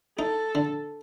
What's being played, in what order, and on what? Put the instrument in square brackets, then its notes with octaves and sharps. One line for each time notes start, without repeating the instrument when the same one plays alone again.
[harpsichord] D#4 [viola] A4
[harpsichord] D3